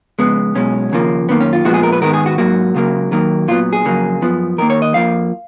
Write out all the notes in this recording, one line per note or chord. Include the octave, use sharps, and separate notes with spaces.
F2 C#3 G#3 B3
B1 B2 G#3 C#4
D#2 C#3 F3 A#3
F#2 D#3 A#3 B3
C#4
F4
A#2 F3 G#3 B3 F#4
G#4
A#4
B4
G#2 D#3 G#3 B3 A#4
G#4
F#4
G#2 F#3 A#3 F#4
C#2 C#3 F#3 A#3
D#2 D#3 F#3 A#3
A#2 F#3 B3 F4
G#4
F2 C#3 F#3 A#3
F#2 F3 B3
D#2 D#3 A#3 A#4
C#5
D#5
F2 F3 A#3 F5